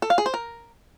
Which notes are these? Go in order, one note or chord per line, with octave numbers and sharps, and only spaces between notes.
A4
F5
G#4
C5
A#4